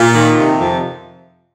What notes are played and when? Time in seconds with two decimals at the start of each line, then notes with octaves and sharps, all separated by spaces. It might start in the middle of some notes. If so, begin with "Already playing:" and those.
Already playing: A#2
0.15 D#3
0.37 C3
0.59 F2